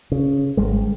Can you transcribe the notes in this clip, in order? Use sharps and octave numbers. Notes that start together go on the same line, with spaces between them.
C#3
G#1 G3 G#3